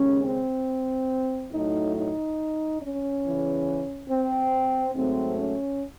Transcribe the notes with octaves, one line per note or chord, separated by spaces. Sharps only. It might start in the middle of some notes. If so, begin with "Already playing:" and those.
Already playing: D#2 C#3 G#3 C#4
C4
A2 F#3 A3 D#4
D#4
C#4
E2 C#3 E3
C4
G#2 F#3 A3 C4
C#4